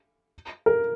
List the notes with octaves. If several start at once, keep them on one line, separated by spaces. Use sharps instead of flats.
A#4